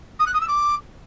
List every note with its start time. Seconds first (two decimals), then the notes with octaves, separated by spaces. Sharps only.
0.19 D#6
0.27 F#6
0.34 D#6
0.41 E6
0.48 D6